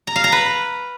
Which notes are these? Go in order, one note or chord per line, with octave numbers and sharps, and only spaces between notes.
A#5
F5
A#5
B4